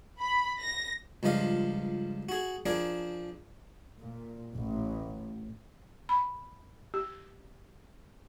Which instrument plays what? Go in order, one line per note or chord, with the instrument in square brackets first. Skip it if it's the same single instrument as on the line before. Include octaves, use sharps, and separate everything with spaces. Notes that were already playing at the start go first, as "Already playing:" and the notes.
[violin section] B5
A#6
[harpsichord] C#2 G2 F3 D#5 F5
F#4 G#4
F3 D4 G#4 A#4
[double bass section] A#2
A1
[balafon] B5
G4